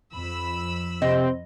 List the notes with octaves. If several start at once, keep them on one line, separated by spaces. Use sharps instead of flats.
F2 B5 E6
C3 C4 D#5